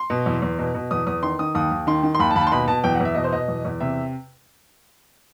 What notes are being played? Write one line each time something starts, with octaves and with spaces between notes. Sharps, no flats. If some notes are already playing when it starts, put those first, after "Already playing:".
Already playing: C6
B2
E2
E2
B2
B2
E2 D#6
E2 D#6
D#3 C6
D#3 D#6
D#2 D#6
D#2
D#3 C6
D#3
C6
D#2 B5
A5
D#2 B5
A5
C6
B2 B5
B2 A5
E2 G5
F#5
E2 E5
B2 D#5
C5
B2 D#5
E2
E2
C3 E5